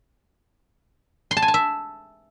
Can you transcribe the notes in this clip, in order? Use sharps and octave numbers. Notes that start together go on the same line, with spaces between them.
C6
A5
G#5
A5
E5